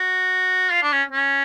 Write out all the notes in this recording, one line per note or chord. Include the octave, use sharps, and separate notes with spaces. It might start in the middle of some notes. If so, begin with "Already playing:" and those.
Already playing: F#4
F4
D4
C#4
C#4